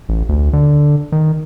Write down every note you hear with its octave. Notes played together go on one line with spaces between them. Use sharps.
A1
D2
D3
D#3